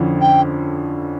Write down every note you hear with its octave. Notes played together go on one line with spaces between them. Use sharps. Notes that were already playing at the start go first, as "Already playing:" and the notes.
Already playing: F2 D3 F3 C#4 E4
G5